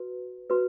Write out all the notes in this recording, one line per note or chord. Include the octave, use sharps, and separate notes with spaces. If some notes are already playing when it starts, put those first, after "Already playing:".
Already playing: F#4 B4
F#4 B4